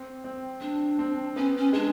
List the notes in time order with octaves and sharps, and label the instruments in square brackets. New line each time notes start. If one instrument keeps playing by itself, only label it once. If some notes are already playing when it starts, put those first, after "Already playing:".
Already playing: [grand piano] C4
C4
[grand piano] C4 [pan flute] D4
[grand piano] C4
[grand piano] B3 [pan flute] C#4
[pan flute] C#4
[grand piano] G#3 [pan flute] D4